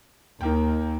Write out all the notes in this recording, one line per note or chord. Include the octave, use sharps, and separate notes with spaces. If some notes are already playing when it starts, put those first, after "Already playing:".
D#2 D#3 A#3 G5